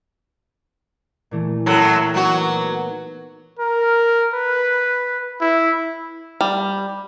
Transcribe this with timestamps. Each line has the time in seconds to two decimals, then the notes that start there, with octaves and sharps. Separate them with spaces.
1.31 A#2 E3 A3
1.66 F#2 A2 F#3
2.14 F#3 A#3 B3 D#4 F#4
3.59 A#4
4.34 B4
5.41 E4
6.41 G3